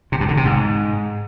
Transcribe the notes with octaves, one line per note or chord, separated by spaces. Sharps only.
C3
G2
D3
C3
G#2